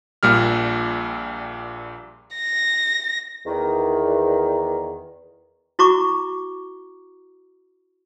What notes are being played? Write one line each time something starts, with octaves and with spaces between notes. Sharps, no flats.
A#1 A#2 G3 F6
A#6
E2 D#3
E4 F#4 A#5 C#6 D6